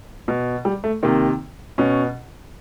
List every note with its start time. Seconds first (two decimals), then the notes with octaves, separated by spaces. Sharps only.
0.28 B2
0.65 G3
0.84 A3
1.03 C3 D#3 A#3
1.78 B2 C#4